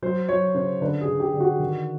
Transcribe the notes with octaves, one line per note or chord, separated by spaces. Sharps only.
F#3 C5
F#3 C#5
C#3 C5
D3 B4
G#4
D3
G4
D3
F#4
D#3